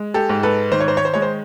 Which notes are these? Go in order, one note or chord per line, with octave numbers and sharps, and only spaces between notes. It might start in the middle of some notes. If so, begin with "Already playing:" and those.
Already playing: G#3
G4 A4
G#2
A4 B4
D#3 C5
C#5
C5
C#5
C5
G#3 C#5
C5